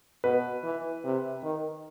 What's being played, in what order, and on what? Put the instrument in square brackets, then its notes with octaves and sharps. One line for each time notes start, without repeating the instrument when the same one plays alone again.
[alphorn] B2 [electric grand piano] B4
[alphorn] E3
C3
D#3